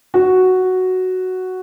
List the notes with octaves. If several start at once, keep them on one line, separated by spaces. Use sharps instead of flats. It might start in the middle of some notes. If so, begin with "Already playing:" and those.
F#4